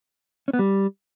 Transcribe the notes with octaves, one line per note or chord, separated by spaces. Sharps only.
C#4
B3
G3